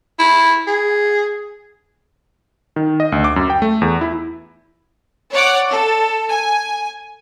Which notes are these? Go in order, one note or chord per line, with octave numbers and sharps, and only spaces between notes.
E4
G#4
D#3
D#5
D2
D6
F#2
G5
A3
E2
E4
C#5 D5 F#5 D6
A4
G#5